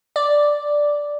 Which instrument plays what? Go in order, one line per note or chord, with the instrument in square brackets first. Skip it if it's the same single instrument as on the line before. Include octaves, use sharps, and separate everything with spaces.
[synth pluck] D5